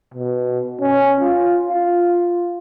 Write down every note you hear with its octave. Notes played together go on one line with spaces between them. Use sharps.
B2
C#4
F4
F4